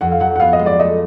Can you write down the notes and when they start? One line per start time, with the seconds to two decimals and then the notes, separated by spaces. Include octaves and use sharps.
0.01 F2 F#5
0.12 F5
0.20 F#3 F#5
0.36 F#5
0.40 B3 F5
0.53 D#5
0.59 G#3
0.66 D5
0.79 A3 D#5